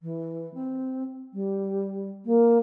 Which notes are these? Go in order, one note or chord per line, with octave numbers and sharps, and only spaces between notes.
E3
C4
G3
A#3